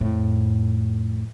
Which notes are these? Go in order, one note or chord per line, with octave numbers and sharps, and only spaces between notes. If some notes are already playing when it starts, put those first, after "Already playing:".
F2 A2